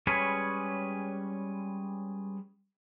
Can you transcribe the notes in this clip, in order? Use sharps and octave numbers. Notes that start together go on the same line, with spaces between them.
G3 G#3 C#4 G#4 B4 C#5